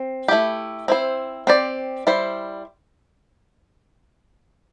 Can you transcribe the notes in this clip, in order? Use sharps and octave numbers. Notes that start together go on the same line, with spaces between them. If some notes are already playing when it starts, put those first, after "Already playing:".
Already playing: C4
A3 E4 G4
C4 E4 C5
C4 G4 D5
G3 E4 C5